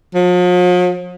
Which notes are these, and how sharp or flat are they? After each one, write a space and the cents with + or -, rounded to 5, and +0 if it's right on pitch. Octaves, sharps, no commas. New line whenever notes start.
F3 +45